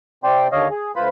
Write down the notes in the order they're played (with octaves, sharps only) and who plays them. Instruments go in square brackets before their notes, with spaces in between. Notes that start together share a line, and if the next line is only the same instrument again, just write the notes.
[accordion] C3 C4 D5 G5 C6
D#2 D3 C#5 D#5 F5
G#4
D2 F4 B4 C5 B5